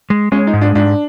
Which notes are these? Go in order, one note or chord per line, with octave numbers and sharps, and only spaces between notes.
G#3
G#3 C#4
D#4
G#2
D4
G#2 D4